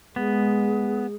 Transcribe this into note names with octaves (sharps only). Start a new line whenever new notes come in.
G#3 B3 G#4